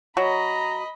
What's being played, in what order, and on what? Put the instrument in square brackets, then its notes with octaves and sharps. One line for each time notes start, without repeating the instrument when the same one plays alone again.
[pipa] F#3 [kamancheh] D#5 B5 [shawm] A#5